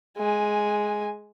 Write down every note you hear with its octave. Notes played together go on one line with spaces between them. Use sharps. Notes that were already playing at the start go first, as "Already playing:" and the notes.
G#3 G#5